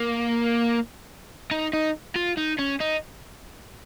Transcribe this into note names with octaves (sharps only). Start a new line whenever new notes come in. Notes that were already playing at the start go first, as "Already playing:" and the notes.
Already playing: A#3
D#4
D#4
F4
D#4
C#4
D#4